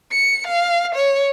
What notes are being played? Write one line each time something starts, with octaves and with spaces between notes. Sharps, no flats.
C#7
F5
C#5